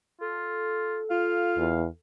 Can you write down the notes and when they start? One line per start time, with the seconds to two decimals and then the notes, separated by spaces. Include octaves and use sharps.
0.21 F4 A4
1.10 F4 F5
1.58 E2